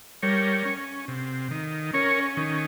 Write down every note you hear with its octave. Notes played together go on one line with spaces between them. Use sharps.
G3 A#4 C#5
C#4
C3
D#3
C#4 A#4 C#5
D#3